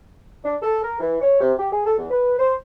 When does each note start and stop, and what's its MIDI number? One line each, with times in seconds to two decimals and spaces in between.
0.44 0.56 62
0.62 0.83 69
0.84 0.99 70
1.00 1.16 52
1.21 1.37 73
1.40 1.52 48
1.59 1.70 67
1.71 1.83 68
1.86 1.94 69
1.98 2.08 40
2.10 2.33 71
2.38 2.53 72